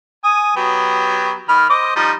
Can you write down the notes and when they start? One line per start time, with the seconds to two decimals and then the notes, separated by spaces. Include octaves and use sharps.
0.24 G#5 D#6
0.56 F#3 B3 G4
1.49 D#3 B5 F6
1.70 C5 D#5 D6
1.96 F3 G3 D#4